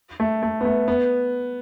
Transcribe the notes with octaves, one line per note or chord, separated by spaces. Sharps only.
A3
A3
B3
A3
B3